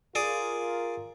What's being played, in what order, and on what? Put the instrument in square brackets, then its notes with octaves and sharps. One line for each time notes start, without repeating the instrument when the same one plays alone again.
[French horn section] F4 A#4 [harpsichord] G#4 D5